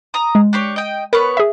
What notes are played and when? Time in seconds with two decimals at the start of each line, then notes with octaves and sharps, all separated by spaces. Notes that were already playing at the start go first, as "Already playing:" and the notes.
0.14 A#5 D#6
0.35 G#3
0.53 D4 G4 C#5
0.76 D#5 G5
1.13 B3 A#4 B4 C#5
1.37 G#4 E5